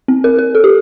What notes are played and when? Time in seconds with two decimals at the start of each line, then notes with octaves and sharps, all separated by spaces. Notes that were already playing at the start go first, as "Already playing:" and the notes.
0.08 C4
0.24 A#4
0.39 A#4
0.55 A4
0.64 G4